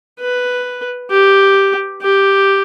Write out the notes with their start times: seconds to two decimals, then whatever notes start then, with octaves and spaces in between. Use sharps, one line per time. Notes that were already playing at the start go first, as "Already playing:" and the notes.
0.20 B4
1.11 G4
2.02 G4